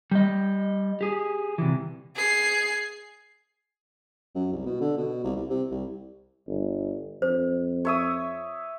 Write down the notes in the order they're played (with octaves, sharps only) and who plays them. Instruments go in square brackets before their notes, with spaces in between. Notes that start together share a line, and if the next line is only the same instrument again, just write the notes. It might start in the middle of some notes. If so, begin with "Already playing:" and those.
[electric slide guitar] G3 D#5
G4 G#4
C3 E3
[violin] G#4 C7
[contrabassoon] F#2
C2
B2
D3
B2
C2
C2
C3
C2
[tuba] G1
[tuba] F2 [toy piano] C5
[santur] C#5 E5 D#6